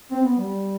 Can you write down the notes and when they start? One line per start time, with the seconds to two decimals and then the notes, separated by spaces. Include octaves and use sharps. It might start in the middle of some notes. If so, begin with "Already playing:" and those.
0.11 C4
0.24 B3
0.37 G3